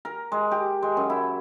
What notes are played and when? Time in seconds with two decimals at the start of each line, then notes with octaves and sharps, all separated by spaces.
0.05 A#4
0.32 G#3
0.51 G4
0.82 G#3
0.97 F#2
1.10 E4